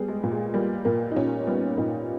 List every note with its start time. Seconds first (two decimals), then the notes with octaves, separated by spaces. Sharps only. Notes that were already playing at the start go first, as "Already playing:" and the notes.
Already playing: G3 B3 G#4
0.08 G#3
0.24 A#2
0.31 G#3
0.54 G3 A#3
0.85 A#2 A#3
1.12 D#4
1.16 A#2 C#4
1.47 G3 B3
1.78 A#2 D#4